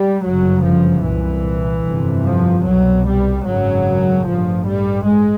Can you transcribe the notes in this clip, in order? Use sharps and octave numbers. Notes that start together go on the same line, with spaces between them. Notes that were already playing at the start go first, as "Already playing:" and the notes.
Already playing: G3
G1 F#2 C#3 F#3
F3
C2 A#2 E3
G1 F2 C3
F3
C2 B2 F#3
G3
G#1 F#2 C#3 F#3
A1 G2 F3
G3
G#3